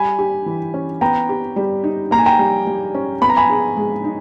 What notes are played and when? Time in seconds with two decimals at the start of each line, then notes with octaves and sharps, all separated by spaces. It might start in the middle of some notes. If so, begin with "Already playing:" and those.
Already playing: G3 G#5 B5
0.19 G4
0.46 E3
0.74 C#4
1.01 B3 G5 A#5
1.29 G4
1.56 G3
1.84 D#4
2.11 A#3 A#5
2.18 G#5
2.26 G5 A#5
2.39 G3
2.67 G3
2.95 C#4
3.21 B3 B5
3.29 A#5
3.37 G#5 B5
3.50 G#4
3.77 G#3
4.04 D#4